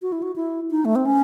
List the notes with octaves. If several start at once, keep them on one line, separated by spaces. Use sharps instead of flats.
F#4
E4
F#4
E4
D#4
A3
C4
C#4